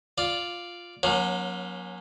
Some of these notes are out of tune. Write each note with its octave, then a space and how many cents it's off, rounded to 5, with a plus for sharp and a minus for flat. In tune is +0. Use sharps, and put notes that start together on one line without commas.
F4 +0 D5 +0
F#3 -25 A#3 +35 C#4 +0